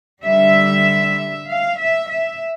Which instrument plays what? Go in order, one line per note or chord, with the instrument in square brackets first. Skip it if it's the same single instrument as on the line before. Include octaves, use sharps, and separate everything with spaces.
[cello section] D3 G3 E5
F5
E5
E5